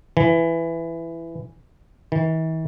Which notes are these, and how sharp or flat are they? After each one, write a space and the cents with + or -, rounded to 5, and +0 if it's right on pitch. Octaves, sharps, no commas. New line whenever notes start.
E3 +10
E3 -45